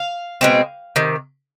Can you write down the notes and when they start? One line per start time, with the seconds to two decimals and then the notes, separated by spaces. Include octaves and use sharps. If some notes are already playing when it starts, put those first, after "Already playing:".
Already playing: F5
0.41 B2 G#3 C4
0.96 C3 D#3